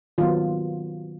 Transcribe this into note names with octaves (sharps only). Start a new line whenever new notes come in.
D#3 F#3 B3 F4